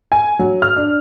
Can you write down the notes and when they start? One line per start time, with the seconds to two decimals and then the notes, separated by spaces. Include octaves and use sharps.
0.12 G#5
0.39 F#3
0.62 F6
0.76 D4